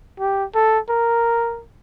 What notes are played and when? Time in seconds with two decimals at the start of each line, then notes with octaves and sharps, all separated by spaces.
0.20 G4
0.55 A4
0.89 A#4